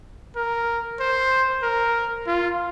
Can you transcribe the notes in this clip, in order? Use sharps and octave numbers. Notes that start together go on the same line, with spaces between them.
A#4
C5
A#4
F4